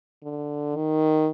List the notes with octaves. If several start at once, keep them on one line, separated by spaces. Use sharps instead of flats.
D3
D#3